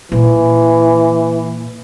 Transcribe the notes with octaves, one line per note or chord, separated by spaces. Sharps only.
A#2 E3